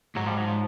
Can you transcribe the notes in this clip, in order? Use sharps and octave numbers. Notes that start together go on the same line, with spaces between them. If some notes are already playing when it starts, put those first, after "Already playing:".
G#2 F#3
F3 G3
F#3
F3